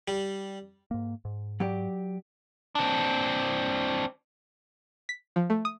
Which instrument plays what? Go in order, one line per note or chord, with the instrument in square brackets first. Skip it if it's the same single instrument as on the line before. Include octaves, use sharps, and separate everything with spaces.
[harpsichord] G3
[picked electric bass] G#2 A#3
G#2
[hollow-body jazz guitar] F#3 G4 D5
[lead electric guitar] C4 D4
[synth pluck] B6
F3
A3
D#6